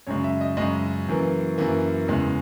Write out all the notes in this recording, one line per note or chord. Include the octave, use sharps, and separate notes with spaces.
F#2 C#3 G#3 C#5
E5
D#5
F#2 C#3 G#3 D#5
F#2 E3 A#3
F#2 E3 A#3 B4
E2 C#3 G#3